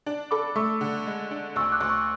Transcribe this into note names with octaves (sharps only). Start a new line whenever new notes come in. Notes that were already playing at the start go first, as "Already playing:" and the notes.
D4
A4 B5 D6
A3 C#6 E6
D3
G#3
D4
D2 C#6 E6
D6 F#6
D2
C#6 E6